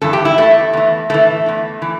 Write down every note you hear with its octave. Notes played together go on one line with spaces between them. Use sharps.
G2 E3 A4
G4
E4
E2 E3 A3
E2 E3
A2 E3 A3
E2 E3
E3